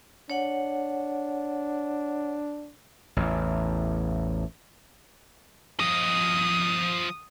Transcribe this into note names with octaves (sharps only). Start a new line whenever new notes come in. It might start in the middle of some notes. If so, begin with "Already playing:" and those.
D4 C#5 F#5
A1 E2
F3 D#5 D#6